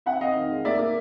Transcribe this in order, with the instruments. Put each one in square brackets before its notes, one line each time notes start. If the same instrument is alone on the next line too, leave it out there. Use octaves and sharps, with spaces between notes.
[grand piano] C4 E5 F#5
C4 D#5 F5
D#3
G#3
A#3 D5 E5
A#3